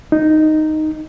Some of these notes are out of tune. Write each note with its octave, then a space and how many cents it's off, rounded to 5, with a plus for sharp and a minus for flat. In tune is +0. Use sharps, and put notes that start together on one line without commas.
D#4 -5